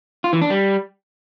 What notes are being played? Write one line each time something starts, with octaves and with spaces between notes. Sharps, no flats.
F4
E3
D4
G3